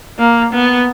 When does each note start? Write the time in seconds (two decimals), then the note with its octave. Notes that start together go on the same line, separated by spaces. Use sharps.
0.19 A#3
0.53 B3